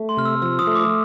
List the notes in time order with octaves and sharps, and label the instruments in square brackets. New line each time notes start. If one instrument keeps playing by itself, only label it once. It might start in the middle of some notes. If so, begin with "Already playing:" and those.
Already playing: [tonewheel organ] A3
[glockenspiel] C6
[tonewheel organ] C3 [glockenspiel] F6
[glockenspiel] E6
[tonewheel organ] F3 [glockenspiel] E6
[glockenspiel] D#6
[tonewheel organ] A3
[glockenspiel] D6